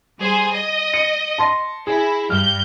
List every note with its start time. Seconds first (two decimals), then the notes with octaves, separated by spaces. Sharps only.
0.21 G3 G#4 C5
0.52 D#5
0.94 C#7
1.38 A5 C6 A#6
1.87 E4 G#4
2.30 G2 F6 G6